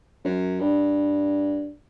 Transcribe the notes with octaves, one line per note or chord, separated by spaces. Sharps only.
F#2
G2